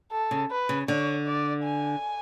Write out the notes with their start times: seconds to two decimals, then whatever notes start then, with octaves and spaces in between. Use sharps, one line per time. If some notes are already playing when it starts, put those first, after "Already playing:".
0.12 A4
0.31 C#3
0.51 B4
0.69 C#3
0.88 D3 C#5
1.26 D5
1.64 G#5